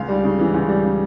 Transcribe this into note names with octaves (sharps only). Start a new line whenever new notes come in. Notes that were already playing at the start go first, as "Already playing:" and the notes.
Already playing: C#2 F5
G3
C#3
E3
C#2
G3
C#3